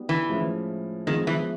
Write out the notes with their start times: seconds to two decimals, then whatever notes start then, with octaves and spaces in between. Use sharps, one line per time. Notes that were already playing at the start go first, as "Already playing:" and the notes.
Already playing: G3 B3 D#4 F#4
0.09 E3
0.29 A2 F3 G#3 C#4 E4
1.07 D#3 F3 G#3 B3
1.27 E3